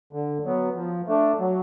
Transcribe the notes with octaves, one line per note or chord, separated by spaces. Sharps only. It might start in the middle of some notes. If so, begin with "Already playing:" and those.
D3
F#3 B3
F3
A3 D4
F#3